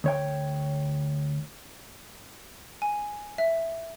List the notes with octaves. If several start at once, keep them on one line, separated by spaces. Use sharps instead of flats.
D2 C#5 G5
G#5
E5